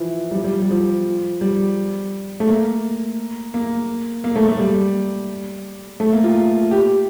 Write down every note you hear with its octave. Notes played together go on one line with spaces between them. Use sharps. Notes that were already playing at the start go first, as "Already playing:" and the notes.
Already playing: E3 F3
G3
F3
G3
G3
F3
G3
A3
A#3
A#3
A#3
A3
A3
G3
A3
A#3
F4
G4